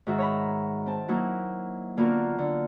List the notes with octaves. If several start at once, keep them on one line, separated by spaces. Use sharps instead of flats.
G#2 D#3 F#4 E5
C#5 A#5 B5
C4 A5
F#3 A#3 D#4 E4 F#4
D3 A#3 B3 F4 F#4 A#4
D3